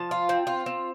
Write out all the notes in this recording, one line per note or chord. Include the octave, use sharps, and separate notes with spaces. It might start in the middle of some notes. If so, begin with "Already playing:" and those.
Already playing: F3 A5
F4
C4
F4
C4